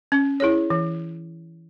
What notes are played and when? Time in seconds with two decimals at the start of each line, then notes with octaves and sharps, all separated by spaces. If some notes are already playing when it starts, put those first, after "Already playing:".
0.12 C#4
0.40 E4 G#4 C#5
0.70 E3